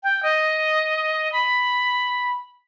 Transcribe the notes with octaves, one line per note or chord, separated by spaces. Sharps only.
G5
D#5
B5